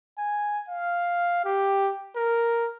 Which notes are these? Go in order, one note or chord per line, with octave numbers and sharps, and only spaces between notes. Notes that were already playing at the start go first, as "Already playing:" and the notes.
G#5
F5
G4
A#4